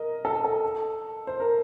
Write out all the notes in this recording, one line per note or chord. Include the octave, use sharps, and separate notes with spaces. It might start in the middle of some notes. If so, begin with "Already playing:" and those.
Already playing: A#4 D#5
A4
A4
C5
A#4